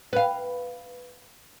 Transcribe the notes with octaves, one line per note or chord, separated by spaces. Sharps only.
B4 F5